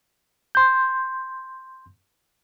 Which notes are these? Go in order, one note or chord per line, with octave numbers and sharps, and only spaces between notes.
C6 G6